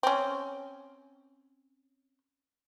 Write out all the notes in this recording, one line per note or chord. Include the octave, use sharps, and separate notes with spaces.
C4 C#4